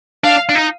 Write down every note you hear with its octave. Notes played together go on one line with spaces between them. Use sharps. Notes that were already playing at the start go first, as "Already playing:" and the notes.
D4 F5
D4
D#4